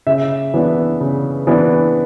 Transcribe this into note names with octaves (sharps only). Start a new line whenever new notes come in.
C#3 E5
E3 B3 D4
C#3
E3 B3 D4